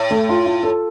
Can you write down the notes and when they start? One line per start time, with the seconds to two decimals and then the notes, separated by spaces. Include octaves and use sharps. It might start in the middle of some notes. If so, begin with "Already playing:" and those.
Already playing: A2
0.11 A3
0.29 F4
0.46 F4
0.63 A4